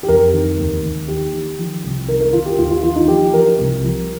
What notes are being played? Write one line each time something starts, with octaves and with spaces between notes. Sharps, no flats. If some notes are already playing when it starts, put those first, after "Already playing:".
G4
F2 A#4
D#3
D#2
D#2
D#3 G4
D#3
F3
C2
D#3 A#4
A#4
D#3 F4
G4
D#2 F4
F4
D#3 F4
D#4
F3 G4
F3 A#4
C2
F3